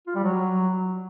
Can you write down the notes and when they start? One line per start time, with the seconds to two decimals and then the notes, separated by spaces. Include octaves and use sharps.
0.07 F4
0.15 G3
0.24 F#3